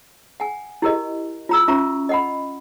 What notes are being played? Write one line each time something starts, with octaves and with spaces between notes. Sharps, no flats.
F#5 G#5
E4 G4 A#4 D#5
F4 A#5 E6
C#4 F4 E5 A#5 C#6
D#5 F#5 B5